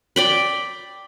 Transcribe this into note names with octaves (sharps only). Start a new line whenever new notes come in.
D5 G5 B5